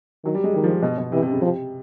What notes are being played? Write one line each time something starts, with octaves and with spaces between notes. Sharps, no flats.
D#3 F#3
G3
G#3
D#3 G3
F3
B2
B2
C3 E3
C3
C#3
C3 F3